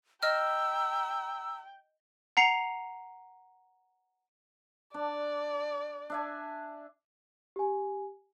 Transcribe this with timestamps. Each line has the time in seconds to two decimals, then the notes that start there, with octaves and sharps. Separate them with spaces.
0.23 D#5 G5 A#5 E6 F6
2.37 F#5 A#5 C7 C#7 F7
4.94 D4 D5
6.10 D4 E5 G#5
7.56 G4 G#5